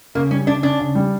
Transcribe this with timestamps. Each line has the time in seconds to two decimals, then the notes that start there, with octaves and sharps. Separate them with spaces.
0.15 C#3 A#3
0.31 G3 C#4
0.47 C#3 D4
0.63 C#4 D4
0.79 C#3
0.95 G3